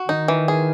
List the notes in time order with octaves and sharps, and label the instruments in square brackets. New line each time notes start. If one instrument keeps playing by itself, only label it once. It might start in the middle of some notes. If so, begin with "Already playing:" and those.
Already playing: [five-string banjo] F#4
[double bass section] D#3 [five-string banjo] D#4
[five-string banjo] E3
G#4